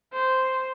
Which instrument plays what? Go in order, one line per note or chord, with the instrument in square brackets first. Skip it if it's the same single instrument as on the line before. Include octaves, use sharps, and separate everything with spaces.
[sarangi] C5